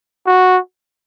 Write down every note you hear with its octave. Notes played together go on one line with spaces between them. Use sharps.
F#4